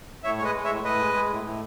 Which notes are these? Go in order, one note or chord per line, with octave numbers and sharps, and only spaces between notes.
A2 C#5 E5
G#3 C#5
B4 D#5
G#3
C#5 E5
A2
A2 B4 D#5
G#3
G#3
A2
A2